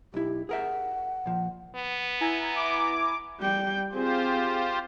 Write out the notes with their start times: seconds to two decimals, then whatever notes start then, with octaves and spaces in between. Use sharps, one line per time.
0.14 B1 E4 G4
0.49 G#4 A#4 E5 F#5
1.26 A#2 F3
1.75 B3
2.21 E4 G#5 A#5
2.56 D6
3.39 G3 G5
3.92 C4 F4 G4 G#4 C5